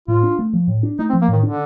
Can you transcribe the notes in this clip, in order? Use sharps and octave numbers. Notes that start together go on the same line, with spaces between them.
A2 F4
D4
A3
F3
A2
D4
A3 D#4
C4
F3
A#3
A2 D#3
D3 D4